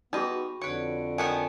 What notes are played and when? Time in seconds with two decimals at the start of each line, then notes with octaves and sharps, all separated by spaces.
0.13 G3 B3 D#4 F#4 G#4 D#5 B5 C#6
0.62 F2 D3 B4 C#5 C#7 D7
1.18 D#3 B3 C#5 G#5 A5 C#7